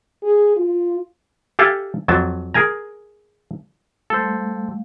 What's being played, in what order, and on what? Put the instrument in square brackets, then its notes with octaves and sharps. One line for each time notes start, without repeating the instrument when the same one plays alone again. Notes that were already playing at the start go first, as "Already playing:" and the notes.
[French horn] G#4
F4
[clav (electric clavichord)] G4 A4 E5 F5 G#5 A5
F2 F#3 A5
G#4 A#4 G#5 A#5
[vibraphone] G3 A3 F5 [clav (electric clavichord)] A4 C5